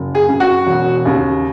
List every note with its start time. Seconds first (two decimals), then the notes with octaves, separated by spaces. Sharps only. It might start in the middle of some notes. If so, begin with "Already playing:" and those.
Already playing: F#1
0.15 G#4
0.29 F#2 C#3
0.40 F#4
0.66 E1
1.05 D#2 C#3